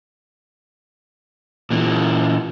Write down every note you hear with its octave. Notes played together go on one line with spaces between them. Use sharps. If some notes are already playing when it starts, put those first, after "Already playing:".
A#2 E3